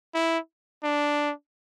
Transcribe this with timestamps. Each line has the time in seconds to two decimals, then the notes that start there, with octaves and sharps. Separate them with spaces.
0.14 E4
0.84 D4